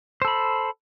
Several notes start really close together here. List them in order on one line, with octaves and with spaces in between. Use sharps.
C5 A4 B5